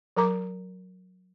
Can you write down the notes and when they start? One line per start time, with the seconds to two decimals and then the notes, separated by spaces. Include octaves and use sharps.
0.17 F#3 A#4 A#5 D6